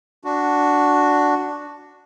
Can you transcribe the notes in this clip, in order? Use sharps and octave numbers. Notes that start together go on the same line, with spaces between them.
D4 F#4